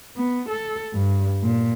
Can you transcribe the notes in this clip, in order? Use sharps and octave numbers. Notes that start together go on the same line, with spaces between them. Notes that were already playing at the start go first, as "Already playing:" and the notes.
B3
A4
G2
A#2